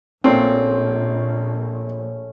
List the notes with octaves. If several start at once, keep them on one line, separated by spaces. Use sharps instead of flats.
A#1 A#2 A3 C4 C#4